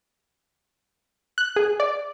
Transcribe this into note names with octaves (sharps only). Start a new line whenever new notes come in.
F#6
G#4
D5